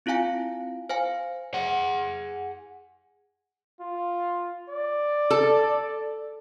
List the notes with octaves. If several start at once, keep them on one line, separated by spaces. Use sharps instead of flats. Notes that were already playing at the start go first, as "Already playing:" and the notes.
C4 E4 F4 F5 G#5 D7
C5 F5 G#5
G#4 F#5
F4
D5
A4